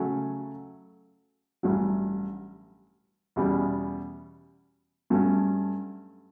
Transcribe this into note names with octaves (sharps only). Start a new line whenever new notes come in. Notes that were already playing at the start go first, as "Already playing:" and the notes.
Already playing: C#3 F#3 A3 C#4
A1 G2 F#3
E2 B2 G3 C#4
G2 F#3 A3 C#4